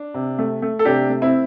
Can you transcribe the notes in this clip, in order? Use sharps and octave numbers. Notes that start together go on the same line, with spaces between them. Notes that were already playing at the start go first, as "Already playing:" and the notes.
Already playing: D4
C3
A3
A3
A4
C3 D4 G4
A3
C4 E4